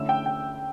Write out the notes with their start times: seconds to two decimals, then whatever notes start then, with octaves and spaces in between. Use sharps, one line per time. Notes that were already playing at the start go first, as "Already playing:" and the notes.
Already playing: D3 A3 C#4 E4 E6
0.09 G5
0.26 G5